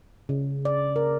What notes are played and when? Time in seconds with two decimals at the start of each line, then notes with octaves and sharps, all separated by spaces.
0.29 C#3
0.65 D5
0.96 A#4